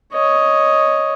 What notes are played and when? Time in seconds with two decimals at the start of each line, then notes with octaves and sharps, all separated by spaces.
0.14 C#5 D#5